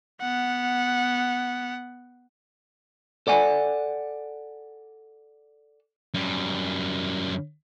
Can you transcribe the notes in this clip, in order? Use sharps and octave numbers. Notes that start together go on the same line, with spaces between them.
B3 F#5
A4 D5 F#5 G#5
F#2 G3